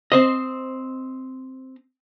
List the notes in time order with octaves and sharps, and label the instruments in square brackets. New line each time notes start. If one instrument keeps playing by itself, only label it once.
[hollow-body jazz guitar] C4 C5 D#5